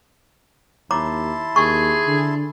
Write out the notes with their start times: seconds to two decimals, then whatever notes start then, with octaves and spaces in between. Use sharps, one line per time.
0.91 D#2 E4 C#5 A5 A#5 C6 D6
1.56 D#2 G#4 C#6
2.08 D3